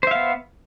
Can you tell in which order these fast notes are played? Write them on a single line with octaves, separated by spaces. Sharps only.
C5 E5 F5 B3